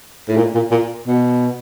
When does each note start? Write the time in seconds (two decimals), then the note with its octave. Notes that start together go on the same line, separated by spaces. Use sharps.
0.29 A2
0.37 A#2
0.55 A#2
0.71 A#2
1.07 B2